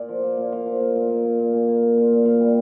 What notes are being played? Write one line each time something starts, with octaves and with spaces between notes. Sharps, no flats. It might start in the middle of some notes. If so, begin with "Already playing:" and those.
Already playing: A#2 D5
F3
A#3
A#2
A#2 F5
F3
A#3
A#2
A#3
A#3
A#2
A#2
A#3
A#3
A#2
A#2
A#2 F5
G3